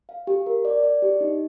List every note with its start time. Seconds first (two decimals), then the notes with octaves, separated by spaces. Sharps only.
0.09 F5
0.27 G4
0.46 A#4
0.65 D5
0.83 D5
1.02 G4
1.21 D#4